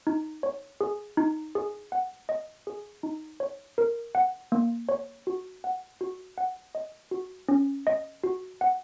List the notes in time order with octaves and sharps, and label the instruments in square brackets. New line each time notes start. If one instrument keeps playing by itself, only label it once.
[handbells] D#4
C#5
G#4
D#4
G#4
F#5
D#5
G#4
D#4
C#5
A#4
F#5
A#3
C#5
F#4
F#5
F#4
F#5
D#5
F#4
C#4
D#5
F#4
F#5